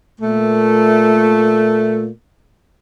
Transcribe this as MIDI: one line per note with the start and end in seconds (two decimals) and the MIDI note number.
0.21 2.09 46
0.21 2.09 57